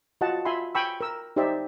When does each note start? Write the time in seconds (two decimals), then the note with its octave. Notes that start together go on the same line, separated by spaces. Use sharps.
0.21 F4 F#4 D#5 F#5 A5
0.45 F4 E5 G#5 B5 C6
0.75 G5 G#5 B5 C#6 E6
1.01 A#4 E6
1.36 D#4 G4 C5 D5 E5